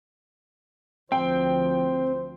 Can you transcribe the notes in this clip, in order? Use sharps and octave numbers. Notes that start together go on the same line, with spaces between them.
D2 F3 C4 C5 G5